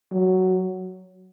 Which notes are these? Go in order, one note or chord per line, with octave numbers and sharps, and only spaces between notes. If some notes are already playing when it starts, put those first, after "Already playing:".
F#3